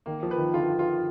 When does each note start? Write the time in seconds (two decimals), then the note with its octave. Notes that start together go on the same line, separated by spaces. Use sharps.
0.06 D#3 A#3
0.23 F3
0.31 B4
0.38 D#3
0.54 D3 F4
0.79 F4